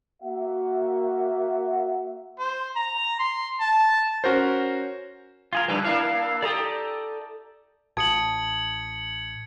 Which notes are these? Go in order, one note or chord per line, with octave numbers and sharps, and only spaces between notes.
A#3 F#4 E5 F#5
C5
A#5
C6
A5
C#4 F#4 A#4 C5
F4 G#4 A#4
C#3 G3 B4
A#3 D4 E4 F5
G4 A4 D5 A#5 D#6
A1 A5 D#6 G#6 C#7 F#7